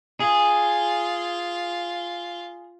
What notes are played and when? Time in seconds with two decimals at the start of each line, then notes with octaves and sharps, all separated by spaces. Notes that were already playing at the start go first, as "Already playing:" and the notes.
0.20 F4 G#4